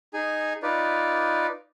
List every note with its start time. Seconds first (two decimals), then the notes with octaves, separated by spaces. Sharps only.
0.14 D#4 G#4 G#5
0.63 D#4 F4 B4 D5